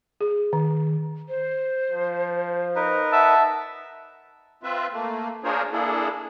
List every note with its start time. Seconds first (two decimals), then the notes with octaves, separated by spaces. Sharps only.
0.21 G#4
0.53 D#3
1.29 C5
1.91 F3
2.76 D#4 A#4 B4
3.12 E5 F#5 A5
4.63 C4 F4 B4 E5
4.92 A3 A#3
5.44 D4 F4 G#4 A#4 C5 C#5
5.72 A#3 D4 E4 G#4 A4